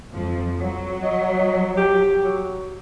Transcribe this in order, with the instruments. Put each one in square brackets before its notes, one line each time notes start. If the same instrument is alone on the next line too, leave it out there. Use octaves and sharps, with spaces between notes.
[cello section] F2 F3
F#3
[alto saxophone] D#5
D#5
G4
F#3